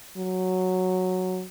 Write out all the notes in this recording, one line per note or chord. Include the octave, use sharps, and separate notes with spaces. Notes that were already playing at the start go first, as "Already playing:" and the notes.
F#3